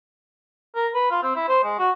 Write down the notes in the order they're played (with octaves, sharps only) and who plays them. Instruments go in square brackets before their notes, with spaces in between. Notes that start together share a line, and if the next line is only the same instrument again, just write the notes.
[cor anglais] A#4
B4
F4
C4
E4
C5
G#3
F#4